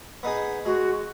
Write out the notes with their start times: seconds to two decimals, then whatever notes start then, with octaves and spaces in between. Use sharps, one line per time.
0.23 B3 D#4 G#4
0.65 G#3 F#4